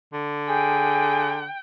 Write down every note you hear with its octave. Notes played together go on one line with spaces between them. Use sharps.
D3
G#4 G5